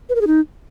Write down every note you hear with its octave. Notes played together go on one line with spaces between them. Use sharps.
B4
A#4
G#4
D#4